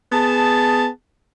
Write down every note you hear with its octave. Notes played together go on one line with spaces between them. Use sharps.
B3 G#4 A5